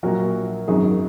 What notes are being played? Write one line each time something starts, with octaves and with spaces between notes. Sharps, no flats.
A#1 A#2 F#3 F#4 A#4
G#1 F#2 F#3 D#4 G#4